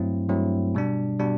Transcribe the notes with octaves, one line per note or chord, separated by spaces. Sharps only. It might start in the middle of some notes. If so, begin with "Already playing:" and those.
Already playing: G2 F#3 A3 C4 E4
G2 F#3 A3 C4 E4
B2 G3 D4
B2 G3 D4